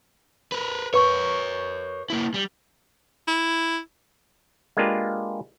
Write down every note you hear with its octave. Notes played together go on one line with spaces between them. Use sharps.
A#4 B4
A#4 B4 C#5 C#6
A#3 E4
G3
E4
G#3 A#3 D4 F4 G4 B4